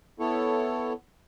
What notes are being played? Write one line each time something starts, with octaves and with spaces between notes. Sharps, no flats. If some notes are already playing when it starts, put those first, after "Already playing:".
B3 E4 A4 C#5